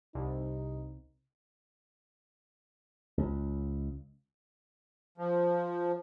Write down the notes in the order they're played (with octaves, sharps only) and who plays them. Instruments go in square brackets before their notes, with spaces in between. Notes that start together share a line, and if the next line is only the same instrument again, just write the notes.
[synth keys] C2 [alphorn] D#4
[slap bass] C#2
[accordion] F3